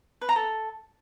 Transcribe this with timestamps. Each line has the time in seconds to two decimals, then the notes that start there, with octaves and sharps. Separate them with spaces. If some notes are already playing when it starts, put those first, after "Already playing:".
0.21 B4
0.29 A#5
0.36 A4